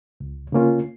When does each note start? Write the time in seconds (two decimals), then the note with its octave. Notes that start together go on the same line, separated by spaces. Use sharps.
0.20 C#2
0.52 C#3 A#3 C#4 F4